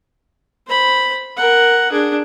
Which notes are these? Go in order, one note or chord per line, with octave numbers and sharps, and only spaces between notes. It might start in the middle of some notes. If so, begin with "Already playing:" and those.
C5 B5
A#4 F#5
D4 G#4